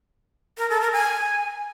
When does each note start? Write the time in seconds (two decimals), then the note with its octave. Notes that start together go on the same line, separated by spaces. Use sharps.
0.58 A#4
0.70 A4
0.81 A#4
0.93 G#5